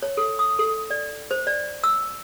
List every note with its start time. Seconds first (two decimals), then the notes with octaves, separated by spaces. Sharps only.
0.03 C#5
0.17 A4
0.39 D#6
0.59 A4
0.91 D5
1.31 C5
1.47 D5
1.84 E6